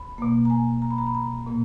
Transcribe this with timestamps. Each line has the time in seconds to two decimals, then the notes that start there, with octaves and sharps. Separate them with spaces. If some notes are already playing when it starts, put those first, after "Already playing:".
Already playing: B5
0.18 B2 A#3
0.45 A#5
0.50 G#5
0.82 A#5
0.91 B5
0.98 A#5
1.06 B5
1.15 A#5
1.46 A#2 A#3